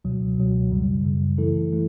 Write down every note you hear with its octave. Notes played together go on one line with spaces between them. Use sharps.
C#2 B2 F#3
C#2 B2 F#3
F#2 C#3 G3
F#2 C#3 G3
E3 A3 E4 A4
E3 A3 E4